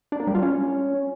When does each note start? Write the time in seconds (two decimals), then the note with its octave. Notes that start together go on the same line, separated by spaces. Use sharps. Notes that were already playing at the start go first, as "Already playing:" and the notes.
0.12 D4
0.20 A#3
0.27 G3
0.35 F4
0.42 C#4